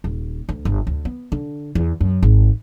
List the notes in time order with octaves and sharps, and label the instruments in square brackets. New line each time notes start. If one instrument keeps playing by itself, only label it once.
[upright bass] D#1
D2
G1
D2
B3
D3
E2
F#2
G#1